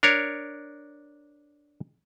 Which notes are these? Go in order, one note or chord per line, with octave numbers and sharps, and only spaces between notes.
D4 A#4 C#5